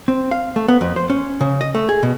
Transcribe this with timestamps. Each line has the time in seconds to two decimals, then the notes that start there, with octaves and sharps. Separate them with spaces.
0.08 C4
0.31 F5
0.56 A3
0.68 B3
0.81 F2
0.96 C5
1.10 C#4
1.41 C#3
1.61 D#5
1.75 A3
1.89 G#4
2.03 B2